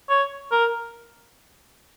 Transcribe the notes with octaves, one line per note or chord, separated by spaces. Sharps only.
C#5
A#4